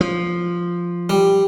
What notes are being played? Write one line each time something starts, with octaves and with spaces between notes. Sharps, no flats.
F3
G3